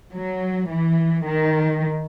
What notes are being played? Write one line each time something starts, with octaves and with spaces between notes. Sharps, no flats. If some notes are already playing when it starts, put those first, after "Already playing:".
F#3
E3
D#3